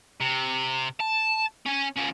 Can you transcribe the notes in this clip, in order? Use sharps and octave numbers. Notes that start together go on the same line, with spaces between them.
C3
A5
C#4 G#5
F3 C#4